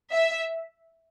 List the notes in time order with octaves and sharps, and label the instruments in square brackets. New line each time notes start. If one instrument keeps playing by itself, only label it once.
[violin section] E5